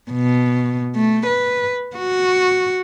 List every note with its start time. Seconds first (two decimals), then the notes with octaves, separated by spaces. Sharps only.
0.11 B2
0.95 A3
1.26 B4
1.96 F#4